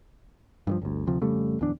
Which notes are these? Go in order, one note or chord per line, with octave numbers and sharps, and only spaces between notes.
G2 D3 F3
G1 D2
D2 C3 F3
F2 C#3 G3 A3
D1 E2 D4